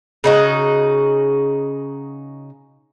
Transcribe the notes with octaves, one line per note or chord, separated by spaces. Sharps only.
C#3 D#4 F#4